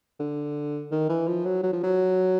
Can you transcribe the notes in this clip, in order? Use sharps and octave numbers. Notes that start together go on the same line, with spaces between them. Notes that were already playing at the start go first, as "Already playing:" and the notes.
D3
D#3
E3
F3
F#3
F#3
F3
F#3